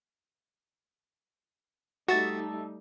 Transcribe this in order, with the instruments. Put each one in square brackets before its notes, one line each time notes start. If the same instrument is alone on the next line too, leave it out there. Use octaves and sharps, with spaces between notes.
[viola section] G3 A3 D#4 [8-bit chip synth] F#4 [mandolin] E5 A5